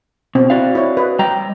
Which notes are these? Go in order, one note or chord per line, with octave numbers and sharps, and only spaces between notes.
B2 C4
E4 F#4 D5 F5
E4 C#5
B4 D#5
G3 D#5 G5 A#5